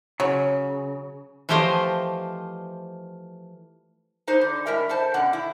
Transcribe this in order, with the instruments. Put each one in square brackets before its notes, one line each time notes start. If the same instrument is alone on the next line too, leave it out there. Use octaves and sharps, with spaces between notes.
[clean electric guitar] C#3 [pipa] F#3
[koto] E3 F3 A3 G4 C5 D#5
[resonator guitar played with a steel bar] D#4 B4 C5
D3
A2 G#3 A#4 E5
A4 C5 A5
B2 D3 C#4 F#5
E4